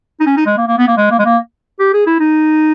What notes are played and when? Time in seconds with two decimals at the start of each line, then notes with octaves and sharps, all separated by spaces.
0.20 D#4
0.26 C#4
0.37 D#4
0.46 G#3
0.57 A#3
0.68 A#3
0.78 B3
0.88 A#3
0.97 G#3
1.11 A#3
1.19 G#3
1.25 A#3
1.79 G4
1.93 G#4
2.06 E4
2.20 D#4